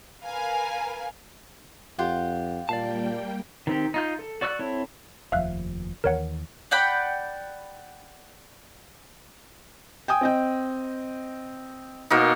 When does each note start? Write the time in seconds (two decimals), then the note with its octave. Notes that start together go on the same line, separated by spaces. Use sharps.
0.24 A#4 B4 F5 G#5
1.99 F2 F4 G4 F#5
2.69 A#2 G3 A#3 D5 F5 G5 A5
3.67 D#3 C4 G4
3.94 D#4 F4 G6
4.19 A4
4.41 F#4 D5 C#6 E6 F#6
4.59 C4 E4 A4 C#5
5.32 F1 D#2 F3 E5 F5 F#6
6.04 D#2 D#3 E3 A#4 C#5 F#5
6.71 D5 F#5 G5 B5
10.08 G5 G#5 D#6
10.21 C4 D#5 G5
12.10 B2 A#3 D#4